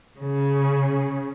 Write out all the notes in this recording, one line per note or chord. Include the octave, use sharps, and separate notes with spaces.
C#3